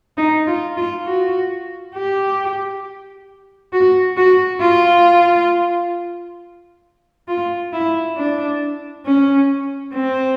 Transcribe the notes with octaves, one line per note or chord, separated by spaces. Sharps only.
D#4
F4
F4
F#4
G4
F#4
F#4
F4
F4
E4
D4
C#4
C4